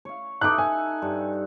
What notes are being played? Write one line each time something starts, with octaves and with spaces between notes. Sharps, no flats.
C#5 F5
D#4 A4 E5 D6 F#6
G#5
G2